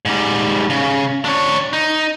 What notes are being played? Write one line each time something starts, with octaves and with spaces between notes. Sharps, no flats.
G#2 G3
C#3
D4 C#5
D#4